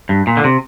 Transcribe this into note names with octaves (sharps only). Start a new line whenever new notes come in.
G2
A#2
D3
C3